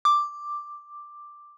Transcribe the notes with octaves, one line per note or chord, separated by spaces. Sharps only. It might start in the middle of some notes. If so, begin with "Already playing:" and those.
D6